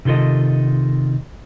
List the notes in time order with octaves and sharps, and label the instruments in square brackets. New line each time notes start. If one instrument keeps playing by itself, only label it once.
[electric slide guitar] C3 D#3 F4 A4 D#5